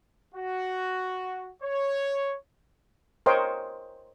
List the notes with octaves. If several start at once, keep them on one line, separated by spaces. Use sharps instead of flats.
F#4
C#5
A#4 C5 C#5 D#5 G5 C6